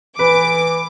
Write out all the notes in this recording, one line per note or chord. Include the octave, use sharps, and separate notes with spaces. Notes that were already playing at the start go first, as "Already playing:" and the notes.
E3 B4 D6